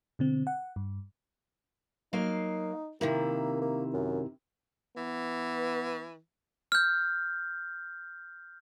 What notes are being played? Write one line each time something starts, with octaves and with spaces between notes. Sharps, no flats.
B2 D3 C4
F#5
G2
F#3 A#3 D#4 F5
C3 D#3 A#3 E4
A#3
F#2
E3 B3
F6 G6